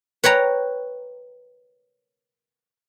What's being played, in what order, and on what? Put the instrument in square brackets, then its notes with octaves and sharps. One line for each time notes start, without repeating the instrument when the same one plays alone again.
[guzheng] B4 C#5 G5 A#5